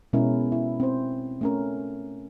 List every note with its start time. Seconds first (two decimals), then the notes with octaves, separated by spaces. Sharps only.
0.13 B2 G#3 C#4 E4 A#4
0.52 E4
0.80 C4 C5
1.41 A3 C#4 A#4